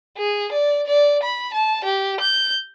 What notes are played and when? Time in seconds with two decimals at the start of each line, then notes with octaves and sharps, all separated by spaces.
0.18 G#4
0.52 D5
0.86 D5
1.23 B5
1.54 A5
1.85 G4
2.20 G6